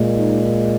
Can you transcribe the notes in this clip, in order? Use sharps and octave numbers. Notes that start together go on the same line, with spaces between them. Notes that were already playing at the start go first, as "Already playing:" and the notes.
Already playing: A#2 G#3
D#4